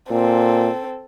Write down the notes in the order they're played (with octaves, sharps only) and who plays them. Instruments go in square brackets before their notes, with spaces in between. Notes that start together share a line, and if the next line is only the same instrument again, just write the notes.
[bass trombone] A#2 [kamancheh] C4 A4